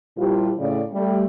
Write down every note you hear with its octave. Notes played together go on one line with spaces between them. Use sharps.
A#2 F3 G3 E4 F4 G4
A2 C#3 D5
G3 A3